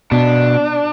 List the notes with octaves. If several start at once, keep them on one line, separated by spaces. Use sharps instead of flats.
B2 D4